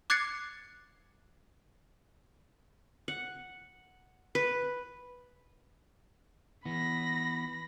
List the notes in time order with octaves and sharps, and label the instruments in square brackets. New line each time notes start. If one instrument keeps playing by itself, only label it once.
[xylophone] D6 F#6 G#6 A6 C7 C#7
[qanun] F#5
B4
[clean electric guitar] E3 B3 [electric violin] B5 A#6